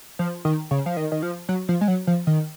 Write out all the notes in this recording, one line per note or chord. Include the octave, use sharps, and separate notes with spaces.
F3
D#3
C#3
F3
D#3
D#3
F3
F#3
F3
G#3
F#3
F3
D#3